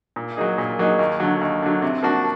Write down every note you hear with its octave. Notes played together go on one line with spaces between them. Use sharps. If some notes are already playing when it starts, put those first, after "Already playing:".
A#2
F#3 A#3 D#4 G#4
A#2
F#3 A#3 D#4 G#4
D#2
D3 F#3
D#2
D3 F#3
C3
F3 A#3 D4 F#4